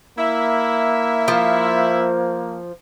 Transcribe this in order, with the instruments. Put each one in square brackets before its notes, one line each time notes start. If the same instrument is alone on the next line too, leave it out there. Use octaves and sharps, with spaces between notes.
[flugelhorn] A#3 [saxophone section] E4 E5
[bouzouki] F3